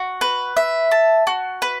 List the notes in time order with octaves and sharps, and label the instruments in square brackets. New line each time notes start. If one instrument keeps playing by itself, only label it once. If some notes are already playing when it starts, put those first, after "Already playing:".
Already playing: [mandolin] F#4
B4
E5
A5
F#4
B4